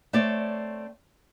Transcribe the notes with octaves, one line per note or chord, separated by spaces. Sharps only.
A3 C4 C#5 D5